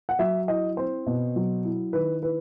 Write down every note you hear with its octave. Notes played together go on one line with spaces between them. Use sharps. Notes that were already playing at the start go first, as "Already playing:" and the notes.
F#5
F#3 E5
E4 D#5
C4 C5
B2
F#3
E4
D#3 B4
E4 B4